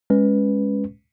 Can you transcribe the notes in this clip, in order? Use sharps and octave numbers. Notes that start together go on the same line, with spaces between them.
G#3 C#4 B4